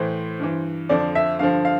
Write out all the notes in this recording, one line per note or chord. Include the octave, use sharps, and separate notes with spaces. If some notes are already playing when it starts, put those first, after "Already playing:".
Already playing: A2 E3 C5
G2 E3
F2 D3 F3 D5
E5
G2 D3 F3 F5
F5